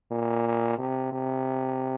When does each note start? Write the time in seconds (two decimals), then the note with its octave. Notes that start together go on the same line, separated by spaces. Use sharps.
0.11 A#2
0.78 C3
1.12 C3